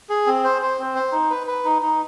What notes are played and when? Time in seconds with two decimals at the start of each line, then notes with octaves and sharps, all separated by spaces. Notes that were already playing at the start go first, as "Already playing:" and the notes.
0.09 G#4
0.26 C4
0.44 C5
0.62 C5
0.79 C4
0.95 C5
1.12 D#4
1.30 B4
1.47 B4
1.64 D#4
1.82 D#4